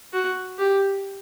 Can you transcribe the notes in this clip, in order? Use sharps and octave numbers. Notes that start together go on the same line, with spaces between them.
F#4
G4